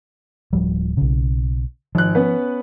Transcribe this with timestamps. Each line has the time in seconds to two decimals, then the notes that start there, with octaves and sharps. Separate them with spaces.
0.53 D1 F3 G3
0.97 B1 C#3
1.95 G#1 F3 F#6
2.15 B3 C#4 B4